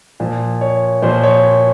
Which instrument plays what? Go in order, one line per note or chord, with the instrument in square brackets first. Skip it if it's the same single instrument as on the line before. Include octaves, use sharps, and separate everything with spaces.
[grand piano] A#2 F3
C#5
A#2 F3 C5
C#5